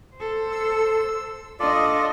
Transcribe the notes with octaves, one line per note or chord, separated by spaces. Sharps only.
A4 C5
E6
D4 F4 A4 D5 D#5